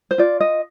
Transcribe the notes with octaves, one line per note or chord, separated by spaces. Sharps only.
C5
F4 D5
D#5